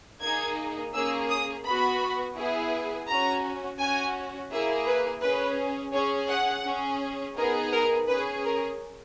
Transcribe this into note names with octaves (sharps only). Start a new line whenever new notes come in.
A#3 D#4 G#4 G#6
A#3 C#4 G#4 E6
D#6
B3 F#4 B5
B3 E4 G#4
C#4 F#4 A#5
C#4 F#4 G#5
A#3 E4 G#4 E5
B4
C#4 G#4 B4
C#4 G#4 C#5
F#5
C#4 G#4
B3 D#4 G#4 A#4
A#4
C#4 G#4 B4
A#4